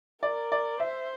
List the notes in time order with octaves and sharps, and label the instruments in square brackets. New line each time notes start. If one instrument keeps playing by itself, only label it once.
[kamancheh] A#4 [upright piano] D5
[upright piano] D5
[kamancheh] C5 [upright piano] E5